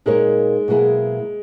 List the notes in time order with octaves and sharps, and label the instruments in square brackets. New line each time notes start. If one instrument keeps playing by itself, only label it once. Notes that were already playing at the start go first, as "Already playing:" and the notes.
[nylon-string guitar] A#2 A#3 D#4 A#4 C#5 [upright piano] G#3
[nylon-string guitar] B2 F#3 A#3 E4 G#4